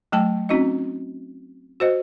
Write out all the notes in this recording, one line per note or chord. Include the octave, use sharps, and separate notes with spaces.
F#3 A3 G5 A5
C4 C#4 D#4 F#4 D#5
F#4 C5 D#5